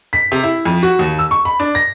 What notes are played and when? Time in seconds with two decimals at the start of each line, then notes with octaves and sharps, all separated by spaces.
0.13 B6
0.32 C3
0.43 E4
0.66 F2
0.83 F#4
0.99 D#2
1.19 E6
1.31 C#6
1.45 B5
1.60 D4
1.75 A#6